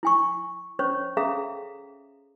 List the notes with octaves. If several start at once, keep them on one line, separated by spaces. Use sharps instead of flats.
E4 G#5 C#6
C#4 C5 C#5 C#6
C#4 G#4 A4 E5 F5 A#5